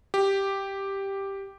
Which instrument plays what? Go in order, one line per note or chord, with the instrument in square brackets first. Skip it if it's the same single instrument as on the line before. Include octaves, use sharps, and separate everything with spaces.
[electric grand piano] G4